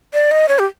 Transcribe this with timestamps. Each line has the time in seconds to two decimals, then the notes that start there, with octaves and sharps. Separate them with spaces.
0.14 D5
0.31 D#5
0.48 C#5
0.59 G4